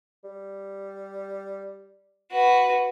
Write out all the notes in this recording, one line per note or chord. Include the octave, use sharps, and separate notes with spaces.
G3
F#4 B4